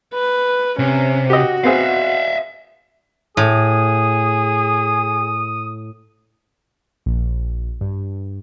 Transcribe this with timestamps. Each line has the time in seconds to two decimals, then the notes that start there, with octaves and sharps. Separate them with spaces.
0.14 B4
0.79 C3 C#4
1.30 F#4 G4 D#5
1.64 B3 C4 G#4 E5 F5
3.37 A2 G#4 D#6
7.06 A#1
7.81 G2